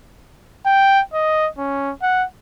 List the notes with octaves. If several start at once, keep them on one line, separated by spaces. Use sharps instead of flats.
G5
D#5
C#4
F#5